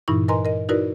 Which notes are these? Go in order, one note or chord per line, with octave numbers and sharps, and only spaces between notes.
G2 A#2 E3 D#4 E4 C#6
A#4 B4 D#5 G#5 A#5 C6
A#4 D#5
D#4 E4 F#4 A#4 B4 D5